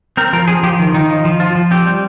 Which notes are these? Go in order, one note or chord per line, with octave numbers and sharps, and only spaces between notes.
C4 A#4
F3 A#4
F3 G#4
F3 G4
D#3
D#3 D#4
F3
F3
F3 F4
F3
C4 G4
G3